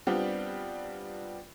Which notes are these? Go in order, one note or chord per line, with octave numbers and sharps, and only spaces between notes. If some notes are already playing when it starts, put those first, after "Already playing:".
G3 B3 C4 D4 F4 G4